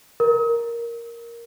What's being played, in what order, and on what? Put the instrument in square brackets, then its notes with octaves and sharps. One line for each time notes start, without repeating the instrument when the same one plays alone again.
[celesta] A#4